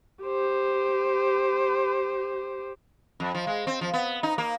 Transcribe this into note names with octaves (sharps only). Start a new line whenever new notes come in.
G4 C5
F2
F3
G#3
C4
F3
B3
D#4
A#3